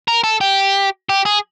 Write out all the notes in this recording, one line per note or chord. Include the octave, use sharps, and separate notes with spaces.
A#4
A4
G4
G4
G#4